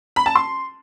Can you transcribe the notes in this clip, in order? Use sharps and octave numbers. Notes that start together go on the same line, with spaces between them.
B5
A5
C6